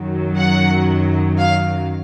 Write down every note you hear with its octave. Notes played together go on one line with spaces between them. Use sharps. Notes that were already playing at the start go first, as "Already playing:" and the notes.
Already playing: F#2 D#3 F#3
F#5
F5